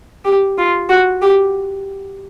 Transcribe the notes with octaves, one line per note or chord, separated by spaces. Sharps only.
G4
F4
F#4
G4